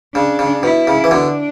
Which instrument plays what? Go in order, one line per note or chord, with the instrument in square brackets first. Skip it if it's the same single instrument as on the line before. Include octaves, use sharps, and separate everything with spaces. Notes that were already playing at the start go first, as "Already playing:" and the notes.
[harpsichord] C#3 [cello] D4
[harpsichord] C#3
[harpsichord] B2 [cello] E4
[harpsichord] C#3
E3
[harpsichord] B2 D3 [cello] D4